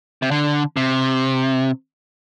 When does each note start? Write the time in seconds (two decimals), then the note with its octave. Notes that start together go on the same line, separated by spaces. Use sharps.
0.22 C3
0.31 D3
0.77 C3